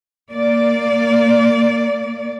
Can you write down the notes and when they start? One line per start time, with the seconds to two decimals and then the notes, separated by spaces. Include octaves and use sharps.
0.30 A#3 D5